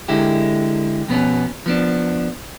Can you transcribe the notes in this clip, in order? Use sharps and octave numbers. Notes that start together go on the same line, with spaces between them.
D3 G#3 E4 G4
F2 B2 B3 C#4
F3 B3 D4